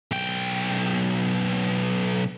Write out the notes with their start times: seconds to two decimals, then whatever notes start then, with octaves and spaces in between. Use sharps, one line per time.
0.11 B1 G5